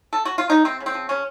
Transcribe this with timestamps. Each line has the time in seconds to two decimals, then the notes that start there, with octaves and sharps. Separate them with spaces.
0.13 A4
0.25 F#4
0.38 F4
0.49 D#3 D#4
0.65 C3 C4
0.80 C#3
0.86 C4
0.94 F3
1.09 C#3 C#4